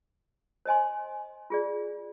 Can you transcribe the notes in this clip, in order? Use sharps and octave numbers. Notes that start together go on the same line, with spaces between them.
C5 D#5 G#5 C6
F4 G#4 D5